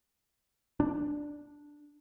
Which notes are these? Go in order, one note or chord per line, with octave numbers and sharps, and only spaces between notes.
D4